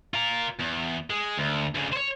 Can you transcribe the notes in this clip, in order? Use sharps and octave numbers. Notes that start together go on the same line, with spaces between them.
F4 A#4
E2
G#3
D2
D2 C#3
C5 C#5